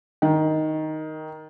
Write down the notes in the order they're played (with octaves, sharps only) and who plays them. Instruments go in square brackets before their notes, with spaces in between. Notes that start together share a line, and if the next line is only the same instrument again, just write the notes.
[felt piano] D#3